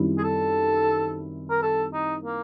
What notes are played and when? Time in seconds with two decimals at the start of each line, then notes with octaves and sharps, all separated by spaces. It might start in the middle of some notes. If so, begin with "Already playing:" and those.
Already playing: F#2 D#3 G3 C4 E4
0.18 G#4
0.24 A4
1.51 A#4
1.63 A4
1.93 D#4
2.25 A#3